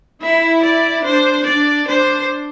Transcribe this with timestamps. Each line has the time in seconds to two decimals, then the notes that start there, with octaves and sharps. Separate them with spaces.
0.22 E4 E5
0.63 D5
1.04 D4 C5
1.46 D4 D5
1.87 D4 C5